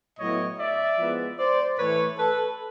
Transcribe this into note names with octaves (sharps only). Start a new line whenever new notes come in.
A2 F#3 B3 E4 C#5 D#5
D5 E5
F3 G#3 B3 E4
C5 D5
A2 E3 A3 B4 C#5
A4 B4